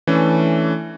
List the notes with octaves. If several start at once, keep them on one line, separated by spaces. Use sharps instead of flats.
E3 A3 C#4 D4 A4